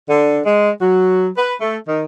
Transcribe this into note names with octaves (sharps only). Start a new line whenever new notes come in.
D3
G#3
F#3
B4
A3
D#3